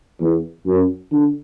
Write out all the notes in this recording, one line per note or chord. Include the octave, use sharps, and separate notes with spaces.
E2
F#2
D3